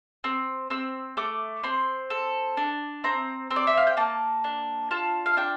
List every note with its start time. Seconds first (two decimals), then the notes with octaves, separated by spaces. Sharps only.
0.24 C4
0.70 C4 E6
1.17 A3 D6
1.64 C4 C6
2.10 A4
2.57 D4
3.04 C4 A#5
3.51 C4
3.56 D5
3.67 E5
3.77 F5
3.87 G5
3.97 A#3 A5
4.44 D4
4.91 F4 A5
5.26 F5
5.37 D4 G5